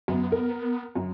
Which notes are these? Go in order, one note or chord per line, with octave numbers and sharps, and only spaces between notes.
F#2 B3
A#4
F#2 F#3